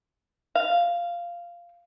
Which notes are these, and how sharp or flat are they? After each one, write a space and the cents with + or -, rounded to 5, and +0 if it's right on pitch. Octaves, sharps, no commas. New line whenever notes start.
F5 -10